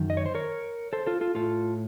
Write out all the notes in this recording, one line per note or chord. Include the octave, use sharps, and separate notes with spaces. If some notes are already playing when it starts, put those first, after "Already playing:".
Already playing: F#2 D#3
D#5
C#5
C5
A#4 C#5
A4 C5
F4 A4
F4 A4
A2 F4 A4